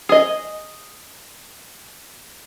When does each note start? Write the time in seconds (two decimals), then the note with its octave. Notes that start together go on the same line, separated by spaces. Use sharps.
0.09 G#4 D#5